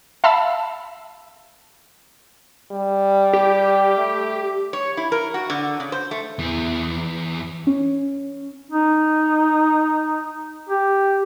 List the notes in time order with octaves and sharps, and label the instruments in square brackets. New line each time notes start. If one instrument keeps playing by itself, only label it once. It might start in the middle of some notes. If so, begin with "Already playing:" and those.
[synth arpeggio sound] E5 F5 A5 B5 E6
[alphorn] G3
[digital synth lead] G4
[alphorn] A3
[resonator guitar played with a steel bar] C#5
E4
A#4
F#4
D3
C#3
C5
A3
[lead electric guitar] E2 E3
[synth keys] C#4
[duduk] D#4
G4